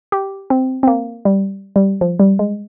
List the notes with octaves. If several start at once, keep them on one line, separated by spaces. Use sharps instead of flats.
G4
C4
C4
A#3
G3
G3
F3
G3
G#3